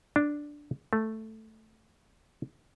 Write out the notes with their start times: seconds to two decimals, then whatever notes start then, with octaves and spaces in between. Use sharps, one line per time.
0.16 D4
0.93 A3